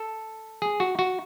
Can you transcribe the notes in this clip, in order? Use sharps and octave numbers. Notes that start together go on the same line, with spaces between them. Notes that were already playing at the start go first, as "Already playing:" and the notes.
Already playing: A4
G#4
F#4
F#4